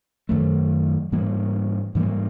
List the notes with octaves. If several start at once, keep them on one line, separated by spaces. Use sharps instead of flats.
F#2 D#3 F#3 A3
G#2 E3 G3 A#3
G#2 E3 G3 A#3